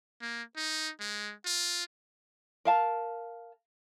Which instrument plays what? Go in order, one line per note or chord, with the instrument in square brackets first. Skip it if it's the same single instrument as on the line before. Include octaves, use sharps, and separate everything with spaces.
[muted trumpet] A#3
D#4
G#3
F4
[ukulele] A#4 F5 A5